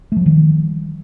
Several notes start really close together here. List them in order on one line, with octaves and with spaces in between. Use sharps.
A3 F3 G3 D#3